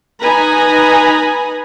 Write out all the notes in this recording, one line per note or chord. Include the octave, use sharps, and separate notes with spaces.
D#4 B4 G#5 A#5 B5